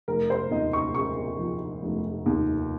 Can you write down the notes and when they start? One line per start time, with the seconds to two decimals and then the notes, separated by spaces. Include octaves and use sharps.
0.08 F1 A#4
0.30 C5
0.51 D#2 D#5
0.73 C#6
0.95 C#3 C#6
1.39 F3
1.83 F1
2.26 D#2